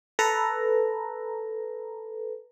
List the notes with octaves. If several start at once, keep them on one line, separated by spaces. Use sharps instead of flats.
A4 B4 A#5